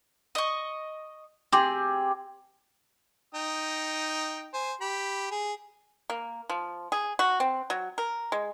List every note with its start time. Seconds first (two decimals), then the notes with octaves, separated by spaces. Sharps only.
0.35 D#5 C#6
1.53 C4 G4 G#4
3.35 D#4 G5 D#6
4.54 C5 G#5
4.81 G4 B5
5.31 G#4
6.10 A#3
6.49 F3
6.92 G#4
7.19 F#4
7.40 C4
7.70 F#3
7.98 A#4
8.32 G#3